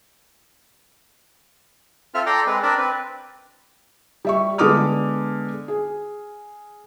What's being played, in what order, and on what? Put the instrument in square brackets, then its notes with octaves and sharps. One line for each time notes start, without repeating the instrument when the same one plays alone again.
[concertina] C4 F4 A4 E5 F6
A4 D5 G5 A#5 C6 D6
G#3 C4 B4
C4 D4 A#4 D5 A5 B5
C4 B4
[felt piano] G3 E5 C#6
D3 G#3 B3 D6 D#6 F6
G#4